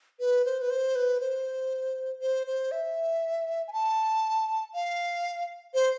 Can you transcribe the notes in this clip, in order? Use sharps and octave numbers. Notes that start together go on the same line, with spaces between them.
B4
C5
B4
C5
B4
C5
C5
C5
E5
G#5
A5
F5
C5